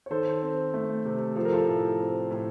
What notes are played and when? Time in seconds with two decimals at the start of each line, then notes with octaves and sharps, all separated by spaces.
0.06 C#5
0.10 D#3 A4 C5
0.42 C4
0.74 A3
1.05 C3
1.36 F3 A4
1.45 A#4
1.53 F4 A4
1.67 A2
1.99 C4
2.30 A2